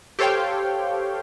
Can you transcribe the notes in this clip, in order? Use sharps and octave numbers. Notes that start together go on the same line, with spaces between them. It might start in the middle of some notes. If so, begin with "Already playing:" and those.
G4 A4 C5 C#5 F5 G5